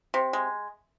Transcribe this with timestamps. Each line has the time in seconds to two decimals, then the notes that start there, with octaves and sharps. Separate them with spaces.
0.14 C3
0.33 G#3